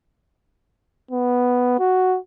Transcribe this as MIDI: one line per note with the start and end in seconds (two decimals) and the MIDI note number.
1.11 1.79 59
1.79 2.17 66